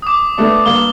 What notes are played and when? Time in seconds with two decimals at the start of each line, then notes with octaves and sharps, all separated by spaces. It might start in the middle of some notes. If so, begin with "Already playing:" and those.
0.02 D6 D#6
0.38 A3 B3 D4
0.66 G2 A#3 G7